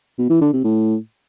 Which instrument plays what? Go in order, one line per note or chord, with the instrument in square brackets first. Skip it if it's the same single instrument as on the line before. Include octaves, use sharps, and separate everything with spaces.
[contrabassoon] B2
E3
D3
C3
A2